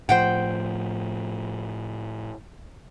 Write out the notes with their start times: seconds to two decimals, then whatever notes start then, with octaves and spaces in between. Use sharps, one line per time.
0.09 A2 F3 C5 F#5 G5